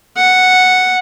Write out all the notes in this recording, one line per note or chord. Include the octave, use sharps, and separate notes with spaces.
F#5